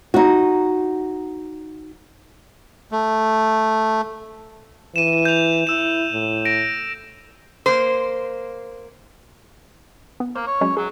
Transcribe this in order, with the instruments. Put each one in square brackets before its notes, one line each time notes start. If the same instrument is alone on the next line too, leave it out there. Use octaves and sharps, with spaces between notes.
[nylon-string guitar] D#4 F#4
[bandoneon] A3
[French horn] E3 [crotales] D#7 E7
[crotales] G6 F7
[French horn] E4 [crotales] E6 E7
[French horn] A2
[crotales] A#6 D7
[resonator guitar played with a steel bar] A#3 C5
[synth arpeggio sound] B3
[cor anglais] A#3 [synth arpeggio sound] C5
[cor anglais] C#5
[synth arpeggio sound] F#3 G#3 C#4
[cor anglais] F#3 [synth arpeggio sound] G#4